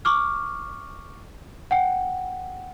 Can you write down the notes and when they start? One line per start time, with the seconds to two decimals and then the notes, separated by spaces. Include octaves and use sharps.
0.05 C#6 D6 F6
1.71 F#5 G5